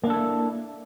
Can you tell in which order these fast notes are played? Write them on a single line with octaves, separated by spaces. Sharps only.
A#3 D4 A4 E4